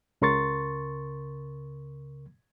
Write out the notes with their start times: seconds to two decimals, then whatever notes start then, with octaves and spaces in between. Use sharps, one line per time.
0.22 C#2 C#3 A#4 C6 C#6 A6